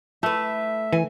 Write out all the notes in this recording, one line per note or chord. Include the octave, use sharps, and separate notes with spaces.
A3 E4 B4 E5
E3 G#5